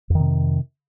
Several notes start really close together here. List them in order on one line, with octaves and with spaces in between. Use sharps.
F2 D#3 C3